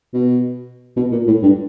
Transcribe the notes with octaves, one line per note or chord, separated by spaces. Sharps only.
B2
B2
A#2
A2
G2